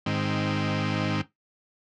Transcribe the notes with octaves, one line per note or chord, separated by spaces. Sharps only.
G#2 D#3 C4